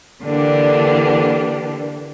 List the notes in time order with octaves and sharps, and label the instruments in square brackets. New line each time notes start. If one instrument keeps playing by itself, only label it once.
[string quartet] D3 E3 A#3 D4 G4